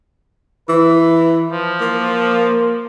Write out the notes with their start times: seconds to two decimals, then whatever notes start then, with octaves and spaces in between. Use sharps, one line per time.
0.69 E3 B4
1.51 F3
1.81 A#3